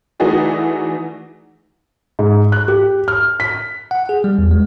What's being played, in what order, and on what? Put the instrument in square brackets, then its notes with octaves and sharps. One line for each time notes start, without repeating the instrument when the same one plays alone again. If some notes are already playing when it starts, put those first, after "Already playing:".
[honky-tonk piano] E3 A3 D#4 F#4 G#4 D5
[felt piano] G#2
F#6
G4
F6
B6
[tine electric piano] F#5
G#4
G3
E2
G#3